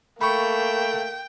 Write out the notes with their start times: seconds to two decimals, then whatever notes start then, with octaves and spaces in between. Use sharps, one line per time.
0.21 A3 A#3 G5 B5 C#6